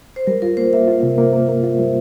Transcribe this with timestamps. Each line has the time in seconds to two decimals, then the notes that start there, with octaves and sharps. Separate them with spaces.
0.16 C5
0.27 G3 A#4
0.42 F4 A#4
0.57 A#3 C5
0.73 A#3 E5
0.88 F4
1.03 C3
1.18 A#3
1.33 A#3
1.49 A#3
1.63 F4
1.78 G3